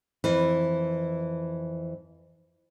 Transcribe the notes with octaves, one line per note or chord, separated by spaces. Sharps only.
F2 E3